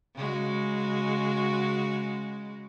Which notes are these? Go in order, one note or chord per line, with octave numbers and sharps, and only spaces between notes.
C#3 G#3 F#4